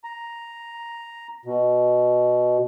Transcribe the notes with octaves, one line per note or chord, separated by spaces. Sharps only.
A#5
B2